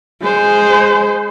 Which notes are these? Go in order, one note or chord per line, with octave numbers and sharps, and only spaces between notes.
G#3 C5